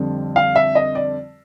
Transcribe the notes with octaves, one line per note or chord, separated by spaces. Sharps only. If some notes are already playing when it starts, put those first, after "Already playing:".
Already playing: F2 D3 G3 C4
F5
E5
D#5
D5